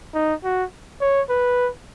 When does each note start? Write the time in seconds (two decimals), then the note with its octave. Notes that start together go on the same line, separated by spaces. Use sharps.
0.14 D#4
0.44 F#4
1.01 C#5
1.29 B4